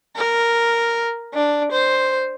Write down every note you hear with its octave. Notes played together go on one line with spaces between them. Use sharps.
A#4
D4
C5